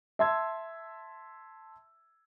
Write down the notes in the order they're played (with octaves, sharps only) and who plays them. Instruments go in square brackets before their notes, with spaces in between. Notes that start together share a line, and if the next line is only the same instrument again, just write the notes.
[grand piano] E5 A5 C6 E6 G#6